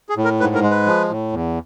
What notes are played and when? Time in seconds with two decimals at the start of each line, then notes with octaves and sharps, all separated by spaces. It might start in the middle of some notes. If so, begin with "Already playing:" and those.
0.09 G#4
0.16 A2
0.24 A#4
0.40 G#2 B4
0.55 A#4
0.62 G#3
0.70 B4
0.86 F3
1.09 A2
1.32 E2